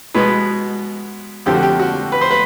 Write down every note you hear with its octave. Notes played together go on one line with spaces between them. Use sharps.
B2 G#3 B3 B4
F2 D3 F3 G4
F#4
G4
F#4
B4
C5
B4